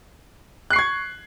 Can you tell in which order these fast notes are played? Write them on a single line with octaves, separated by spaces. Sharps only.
F#6 C7 C#6 G#6